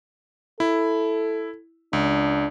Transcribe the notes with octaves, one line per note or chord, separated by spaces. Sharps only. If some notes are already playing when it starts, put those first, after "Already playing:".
E4 A4
C#2 D4